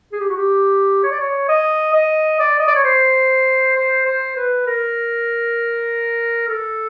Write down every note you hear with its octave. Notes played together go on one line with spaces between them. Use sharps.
G#4
G4
F#4
G4
C#5
D5
C#5
D#5
D#5
D5
D#5
D5
C#5
C5
C5
C5
B4
A#4
A4